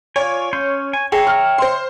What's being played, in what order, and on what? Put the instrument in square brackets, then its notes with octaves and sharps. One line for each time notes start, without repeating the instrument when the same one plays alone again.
[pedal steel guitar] F4 D5 G#5 [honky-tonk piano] C#5
[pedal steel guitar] C#4 C6 G6
G#5
[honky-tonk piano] G#4 [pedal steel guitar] C#5 E5 A#5 [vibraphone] G5
[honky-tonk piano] F6
C5 C6